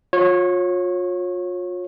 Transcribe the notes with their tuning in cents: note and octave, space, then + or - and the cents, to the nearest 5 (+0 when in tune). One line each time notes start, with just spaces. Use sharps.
F4 +35 C#5 -20